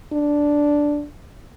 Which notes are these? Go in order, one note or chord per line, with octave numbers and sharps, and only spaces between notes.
D4